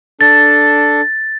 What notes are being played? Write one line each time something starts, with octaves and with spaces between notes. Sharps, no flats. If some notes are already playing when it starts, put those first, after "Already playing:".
D4 A4 A6